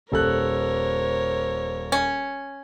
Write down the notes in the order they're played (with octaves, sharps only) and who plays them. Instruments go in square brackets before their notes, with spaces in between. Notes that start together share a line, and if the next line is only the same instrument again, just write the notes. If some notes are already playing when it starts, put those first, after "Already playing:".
[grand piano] D#1 A4 F#6 [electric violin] A#4 C#5 [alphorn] C5
[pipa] C#4